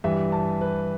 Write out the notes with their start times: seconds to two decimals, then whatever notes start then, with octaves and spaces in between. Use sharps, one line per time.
0.04 G2 E3 G3 E5
0.32 A5
0.61 B4